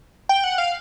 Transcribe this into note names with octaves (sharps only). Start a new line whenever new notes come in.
G5
F#5
F5